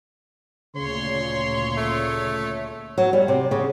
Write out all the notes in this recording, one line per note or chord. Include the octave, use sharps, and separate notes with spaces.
D2 A#2 C#3 C#5 C6
A3
F#3
G3
C3
C#3